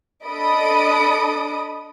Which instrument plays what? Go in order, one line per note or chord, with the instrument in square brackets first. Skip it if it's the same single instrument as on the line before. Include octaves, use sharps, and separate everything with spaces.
[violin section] D4 A4 D#5 B5 D#6 D7